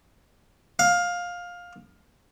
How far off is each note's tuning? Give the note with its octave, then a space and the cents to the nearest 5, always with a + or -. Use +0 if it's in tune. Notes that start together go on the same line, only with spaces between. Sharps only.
F5 +15